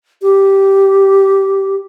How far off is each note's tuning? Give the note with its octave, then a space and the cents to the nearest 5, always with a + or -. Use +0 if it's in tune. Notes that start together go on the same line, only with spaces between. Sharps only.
G4 -10